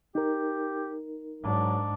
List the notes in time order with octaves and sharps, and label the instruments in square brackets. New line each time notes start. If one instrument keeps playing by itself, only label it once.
[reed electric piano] D#4 A#4 [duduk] G4
[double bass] G#2 D4 [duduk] F#3